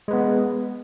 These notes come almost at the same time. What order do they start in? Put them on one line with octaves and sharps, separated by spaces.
G#3 B4 B3